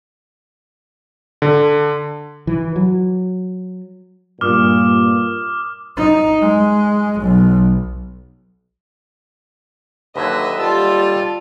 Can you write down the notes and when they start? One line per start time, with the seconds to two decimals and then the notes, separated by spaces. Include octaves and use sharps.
1.42 D3
2.47 E3
2.76 F#3
4.41 G2 A#2 D6 D#6 F6
5.97 D#4
6.41 G#3
7.21 B1
10.16 D#2 D3 F#3 B4 D#5 E5
10.59 G3 F4 A5 E6